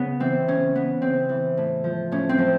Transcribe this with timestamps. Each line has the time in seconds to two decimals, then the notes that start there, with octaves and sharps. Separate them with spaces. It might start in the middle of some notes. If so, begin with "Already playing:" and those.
Already playing: C#3 B3
0.20 E3 C4
0.48 C#3 C#4
0.75 E3 B3
1.02 C#3 C4
1.29 E3
1.57 A2
1.84 F3
2.12 A2 C#4
2.29 C4
2.38 F3